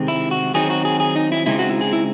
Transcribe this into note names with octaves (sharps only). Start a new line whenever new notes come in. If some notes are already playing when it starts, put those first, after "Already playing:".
Already playing: C3 D#3 G#3 C4
E4
F#4
D#3 F#3 C4 D#4 G#4
F#4
G#4
G#4
D#4
E4
C#3 G#3 C4 D#4 E4
F#4
E4
G#4
E4